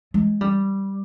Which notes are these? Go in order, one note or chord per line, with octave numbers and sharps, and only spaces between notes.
G#3
G3